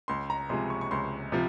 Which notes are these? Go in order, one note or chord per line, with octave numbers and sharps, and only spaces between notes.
C#2 C6
A#5
C3 F3 G#3 C6
C#6
C#6
C#2 C6
C3 F3